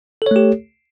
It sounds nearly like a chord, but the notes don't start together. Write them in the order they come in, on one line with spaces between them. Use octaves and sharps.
A4 C#5 A3 G4